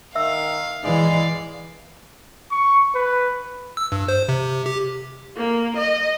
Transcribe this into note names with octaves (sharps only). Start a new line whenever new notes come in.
D#3 E5 F5 E6
E3 G#3 D5 F5
C#6
B4
E6
G2
C5
C3
G4
A#3
D#5